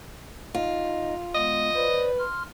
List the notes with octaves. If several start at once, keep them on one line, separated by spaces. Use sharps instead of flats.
D#4 F4 D#5
G#3 B3 D#5
B4 C5 D5
C6 F6